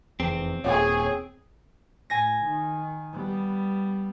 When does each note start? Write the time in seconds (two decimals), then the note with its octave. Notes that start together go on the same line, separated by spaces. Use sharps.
0.20 F1 E2 C4
0.64 D#1 G#4 C#5
2.10 A2 G#5 A#6
2.45 D#3
3.13 G3 B3